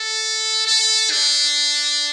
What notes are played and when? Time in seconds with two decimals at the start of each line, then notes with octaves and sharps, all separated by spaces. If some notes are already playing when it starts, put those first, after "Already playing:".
Already playing: A4
0.67 A4
1.11 D4